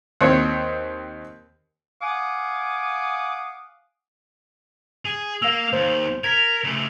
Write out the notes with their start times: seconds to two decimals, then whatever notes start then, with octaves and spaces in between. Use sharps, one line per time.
0.21 D#2 C4 C#5
2.01 F5 F#5 G#5 D6 D#6
5.05 G#4
5.42 A#3 F5 E6
5.73 D#2 C5
6.24 A#4 G#6 B6
6.64 C#3 A3